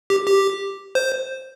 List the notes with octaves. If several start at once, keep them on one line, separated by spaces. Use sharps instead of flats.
G4
G4
C5